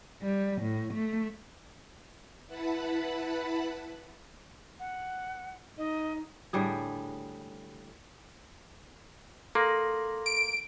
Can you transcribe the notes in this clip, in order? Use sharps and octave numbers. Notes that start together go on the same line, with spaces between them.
G3
A2
A3
E4 B4 F#5 A5 B5
F#5
D#4 D#5
A2 D3 G3 G#4
A#3 A4 C6 A#6
D7